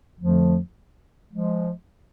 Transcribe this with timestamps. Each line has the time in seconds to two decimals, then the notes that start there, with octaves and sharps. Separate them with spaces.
0.18 F2 D3 F3 A3
1.31 F3 G#3